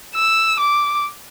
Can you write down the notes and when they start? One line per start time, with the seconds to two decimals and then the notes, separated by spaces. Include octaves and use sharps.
0.15 E6
0.60 D6